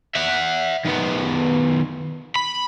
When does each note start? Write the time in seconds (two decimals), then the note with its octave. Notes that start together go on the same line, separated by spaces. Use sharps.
0.15 E5 F#5
0.86 D#3 B3
2.36 B5